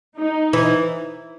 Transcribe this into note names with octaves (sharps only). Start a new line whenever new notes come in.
D#4
E3